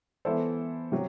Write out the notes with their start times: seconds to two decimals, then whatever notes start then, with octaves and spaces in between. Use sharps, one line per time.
0.25 E3 B3 E4 A4 C5
0.92 C3 F#3